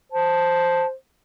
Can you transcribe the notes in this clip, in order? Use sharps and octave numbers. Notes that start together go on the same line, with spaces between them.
C5 A5